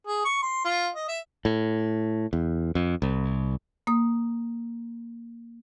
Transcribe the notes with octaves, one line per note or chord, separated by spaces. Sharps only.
G#4
C#6
C6
F4
D#5
E5
A2
E2
F2
C2
A#3 D#6